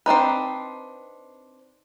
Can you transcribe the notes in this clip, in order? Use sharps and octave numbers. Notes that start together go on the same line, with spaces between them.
C4 D4 D#4 B4